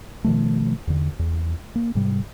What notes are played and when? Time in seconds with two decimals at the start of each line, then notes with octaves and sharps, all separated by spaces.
0.24 B2 D#3 F3 A3
0.87 E2 D3
1.19 E2
1.75 A#3
1.95 G#2 C3 G3